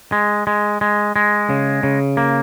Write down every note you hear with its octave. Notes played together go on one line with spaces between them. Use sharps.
G#3
G#3
G#3
G#3
C#3
C#3
A#3